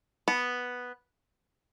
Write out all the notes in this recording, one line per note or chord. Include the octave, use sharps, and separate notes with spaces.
B3